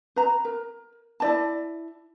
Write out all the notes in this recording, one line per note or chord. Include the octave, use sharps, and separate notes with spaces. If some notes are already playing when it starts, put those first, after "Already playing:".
B4 A#5
A#4
E4 D5 A5